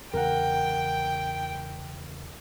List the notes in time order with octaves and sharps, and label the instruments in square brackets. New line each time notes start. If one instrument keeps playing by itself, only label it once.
[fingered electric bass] E2 C#3 E3 [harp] A#4 F#5 [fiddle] G5